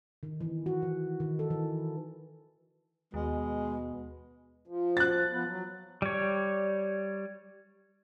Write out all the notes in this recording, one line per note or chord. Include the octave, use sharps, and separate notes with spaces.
D#3
E3
F#4
E3
D#3
A4
E3
D#2 B2 G#3
F3
F#6 A6
F3 B3
F#3
G3 C#5